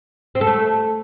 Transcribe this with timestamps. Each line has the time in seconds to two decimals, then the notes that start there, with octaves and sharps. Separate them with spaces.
0.35 C4
0.41 A4
0.47 A3